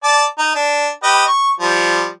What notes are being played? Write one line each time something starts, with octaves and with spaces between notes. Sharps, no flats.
D5 A5 D6
D#4
D4
G4 B4 D#5
C#6
F3 G3